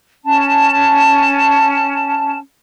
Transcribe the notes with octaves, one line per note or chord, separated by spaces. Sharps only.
C#4 A5